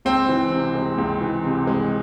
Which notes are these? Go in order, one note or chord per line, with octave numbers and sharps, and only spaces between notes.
C#2 C4
E3
C3
G#3
C#2
E3
C3
G#3